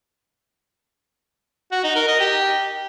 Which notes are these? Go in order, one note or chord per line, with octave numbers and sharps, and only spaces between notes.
F#4
D#4
A#4
D#5
G4